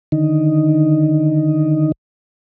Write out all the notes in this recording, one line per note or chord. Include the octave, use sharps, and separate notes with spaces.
D3 D#3 D#4